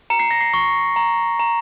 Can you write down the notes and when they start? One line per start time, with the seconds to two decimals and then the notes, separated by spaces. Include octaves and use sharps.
0.10 A#5 C#7
0.19 C7
0.31 A#6
0.41 C7
0.54 C#6
0.96 A#5
1.39 A#5